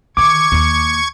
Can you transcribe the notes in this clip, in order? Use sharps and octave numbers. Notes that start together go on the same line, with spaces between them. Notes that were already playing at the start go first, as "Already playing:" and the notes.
D3 D#3 C#6 D6 G#6
D#2